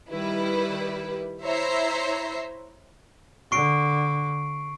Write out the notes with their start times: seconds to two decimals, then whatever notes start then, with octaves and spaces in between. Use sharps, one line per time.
0.11 D#3 G3 E4 B4
1.44 E4 C5 C#5 E5 A#5 C7
3.52 D3 C#6 C7 D7